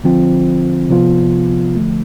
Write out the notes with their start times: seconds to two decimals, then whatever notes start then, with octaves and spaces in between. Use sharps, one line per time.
0.04 D3 F3 C4 F4
0.89 C3 F3 B3 F4
1.76 D3 F3 A3